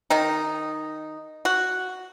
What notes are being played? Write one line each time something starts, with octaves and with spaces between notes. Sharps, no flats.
D#3 D#4
F#4